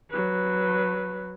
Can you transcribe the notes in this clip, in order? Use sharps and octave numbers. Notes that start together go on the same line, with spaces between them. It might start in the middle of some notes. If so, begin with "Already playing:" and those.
F#3 B4